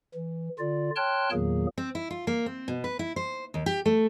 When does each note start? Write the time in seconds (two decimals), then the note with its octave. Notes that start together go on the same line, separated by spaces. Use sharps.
0.15 E3
0.59 D3 F4 D5
0.96 C#5 G5 A5 C6 F6 F#6
1.32 E2 A#2 D#3 F#3 A#3 G#4
1.78 C4
1.95 E4
2.10 F4
2.27 A#3
2.46 C4
2.68 B2
2.84 B4
2.99 E4
3.16 C5
3.54 D#2
3.66 G4
3.86 A3